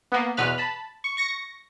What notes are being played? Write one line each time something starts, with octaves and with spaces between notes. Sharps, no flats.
A#3 B3
E2 B2 B4 F6
A5 B5
C#6
C#6 A#6 C#7